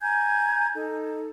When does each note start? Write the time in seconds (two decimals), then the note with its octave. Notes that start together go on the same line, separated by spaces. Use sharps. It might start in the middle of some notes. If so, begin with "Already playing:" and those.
0.02 G#5 A#5 G6 G#6
0.74 D#4 A4